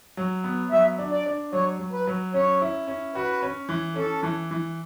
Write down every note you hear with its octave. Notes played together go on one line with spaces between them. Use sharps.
F#3
B3
F#3 E5
D4
D5
D4
F#3 C#5
F#3
B4
F#3
C#4 C#5
E4
C#4
F#4 B4
C#4
E3
C#4 A4
E3
E3